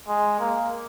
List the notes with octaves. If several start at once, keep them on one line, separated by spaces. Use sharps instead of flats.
G#3
A#3